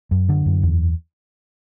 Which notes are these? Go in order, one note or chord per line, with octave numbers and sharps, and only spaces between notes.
F#2
D3
F#2
E2